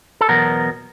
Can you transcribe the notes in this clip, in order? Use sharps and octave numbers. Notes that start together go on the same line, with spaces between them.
A4
E2 B2 F#3 B3 A#4